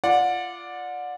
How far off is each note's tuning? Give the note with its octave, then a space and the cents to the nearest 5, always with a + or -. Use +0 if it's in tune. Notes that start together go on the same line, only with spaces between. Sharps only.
F4 -20 D5 +0 F#5 -30